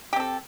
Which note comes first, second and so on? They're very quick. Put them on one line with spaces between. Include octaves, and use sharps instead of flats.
G4 C4 A4